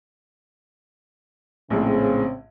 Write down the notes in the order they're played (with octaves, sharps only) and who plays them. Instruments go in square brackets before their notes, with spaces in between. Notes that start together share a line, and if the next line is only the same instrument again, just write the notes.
[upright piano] A#1 A2 G#3 [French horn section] C#3 C4